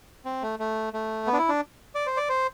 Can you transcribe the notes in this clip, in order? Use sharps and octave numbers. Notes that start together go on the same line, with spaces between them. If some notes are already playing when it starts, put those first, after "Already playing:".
C4
A3
A3
A3
B3
D4
E4
D4
D5
C5
D5
C5